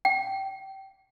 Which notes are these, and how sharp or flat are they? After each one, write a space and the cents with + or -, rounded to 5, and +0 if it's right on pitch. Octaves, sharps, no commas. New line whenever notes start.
G5 -20